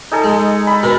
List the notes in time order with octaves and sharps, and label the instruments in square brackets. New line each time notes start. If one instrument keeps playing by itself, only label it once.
[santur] D#4 G#4 A4
[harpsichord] G#3
[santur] B5
[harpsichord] B2 D4 [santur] A#4